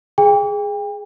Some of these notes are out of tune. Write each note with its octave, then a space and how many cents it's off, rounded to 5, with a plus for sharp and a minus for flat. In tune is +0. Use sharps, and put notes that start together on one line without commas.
G#4 +0 G5 +35